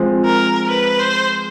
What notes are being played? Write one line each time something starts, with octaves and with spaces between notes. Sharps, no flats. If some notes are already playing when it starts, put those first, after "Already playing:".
Already playing: F3 G#3 C4
A#4
B4
C5